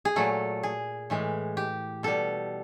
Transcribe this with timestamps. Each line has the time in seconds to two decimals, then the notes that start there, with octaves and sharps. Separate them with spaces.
0.05 G#4
0.16 A#2 F#3 A3 A4
0.63 G#4
1.10 A2 E3 G#3
1.57 G4
2.03 B2 G3 A4